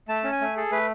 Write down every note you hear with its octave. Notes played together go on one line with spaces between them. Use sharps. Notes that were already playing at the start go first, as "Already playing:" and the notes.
A3 A5
C#4
G#5
A3
G#4 A4
A3 B4